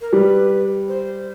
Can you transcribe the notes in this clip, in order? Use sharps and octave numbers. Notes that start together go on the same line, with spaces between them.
A#4
G3 B4
C5